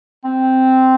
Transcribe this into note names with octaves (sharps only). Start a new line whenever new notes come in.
C4